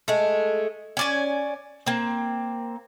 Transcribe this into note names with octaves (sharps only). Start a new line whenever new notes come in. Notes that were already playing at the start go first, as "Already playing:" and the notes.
G#3 A3
C#4 D5 G#5
A#3 C4